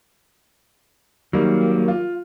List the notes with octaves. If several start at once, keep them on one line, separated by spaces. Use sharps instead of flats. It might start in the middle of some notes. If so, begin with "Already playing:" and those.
D#3 F#3 G3 A#3
F4